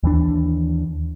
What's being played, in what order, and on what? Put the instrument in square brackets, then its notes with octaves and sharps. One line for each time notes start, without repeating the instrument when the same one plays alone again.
[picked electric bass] D#2 E3 D4